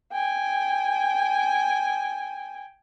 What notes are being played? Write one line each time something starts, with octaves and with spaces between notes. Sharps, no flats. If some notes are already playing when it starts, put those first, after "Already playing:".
G5 G#5